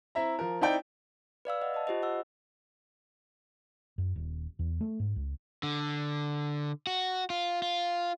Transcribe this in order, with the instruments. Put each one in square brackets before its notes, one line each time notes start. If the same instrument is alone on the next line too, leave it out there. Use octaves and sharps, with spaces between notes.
[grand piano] C4 E4 E5 A#5
F3 A#4
C4 D#4 E4 D5 G5
[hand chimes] B4 D5 F5 E6
D#5 F#5
D#5 A5
F4 G4 C5 D#5
F#5 E6
[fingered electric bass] F#2
D#1
E2
A3
G#2
C#2
[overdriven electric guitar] D3
F#4
F4
F4